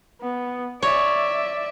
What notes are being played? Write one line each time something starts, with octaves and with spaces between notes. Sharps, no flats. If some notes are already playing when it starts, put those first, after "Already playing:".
B3
C#5 D5 E5